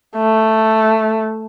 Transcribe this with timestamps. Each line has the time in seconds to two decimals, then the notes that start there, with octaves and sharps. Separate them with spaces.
0.16 A3